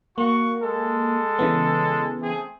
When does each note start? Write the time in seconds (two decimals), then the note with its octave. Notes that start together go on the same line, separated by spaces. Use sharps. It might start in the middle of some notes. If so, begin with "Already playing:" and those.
0.18 A#3 F#4 C#6
0.62 G#3 A4
1.39 C#3 E3 B3
2.22 A3 C4 G#4